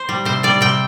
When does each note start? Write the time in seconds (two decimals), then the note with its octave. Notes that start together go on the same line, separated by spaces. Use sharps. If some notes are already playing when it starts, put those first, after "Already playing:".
Already playing: C5
0.09 G3
0.25 C3 C5
0.43 G3 D5
0.61 C3 G5